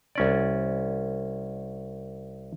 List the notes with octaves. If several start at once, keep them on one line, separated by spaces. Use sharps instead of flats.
C2 C#4 D5